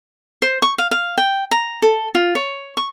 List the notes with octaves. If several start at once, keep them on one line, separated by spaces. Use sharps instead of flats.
C5
C#6
F5
F5
G5
A#5
A4
F4
C#5
C#6